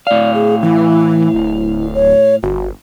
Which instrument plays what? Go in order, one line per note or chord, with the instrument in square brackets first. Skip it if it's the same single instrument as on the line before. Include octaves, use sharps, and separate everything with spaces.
[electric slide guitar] A2 F5 [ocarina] D5
[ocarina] G#4
[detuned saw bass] E3 [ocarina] E4
[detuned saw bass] D1
[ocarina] C#5
[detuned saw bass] G1 [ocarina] F#4